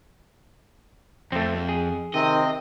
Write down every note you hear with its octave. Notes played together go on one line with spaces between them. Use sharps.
F2 A3 C4
G#4
C3 D#3 C4 D#5